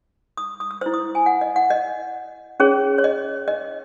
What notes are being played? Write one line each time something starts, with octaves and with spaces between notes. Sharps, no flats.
D#6
D#6
E6
E4 C5 E6
D#6
G#5
F#5
D#5
F#5
D#5
C#4 G#4 C#5
C#5
D#5
D#5